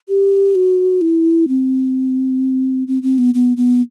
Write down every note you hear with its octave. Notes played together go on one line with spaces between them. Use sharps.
G4
F#4
E4
C4
C4
C4
B3
B3
B3